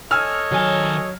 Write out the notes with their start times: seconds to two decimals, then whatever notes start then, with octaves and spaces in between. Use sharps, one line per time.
0.11 A4 C#5 D#5 G#5 E6 F6
0.52 D#3 F#3 G#5